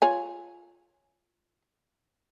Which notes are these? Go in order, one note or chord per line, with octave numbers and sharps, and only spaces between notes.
F4 C#5 G#5